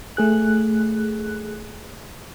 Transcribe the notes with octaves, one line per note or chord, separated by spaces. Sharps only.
A3 G#4 F#6